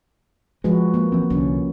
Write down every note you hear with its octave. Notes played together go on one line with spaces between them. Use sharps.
F3 G#3 F#4 B4
A#3
E3 C4
C2 D3 C#4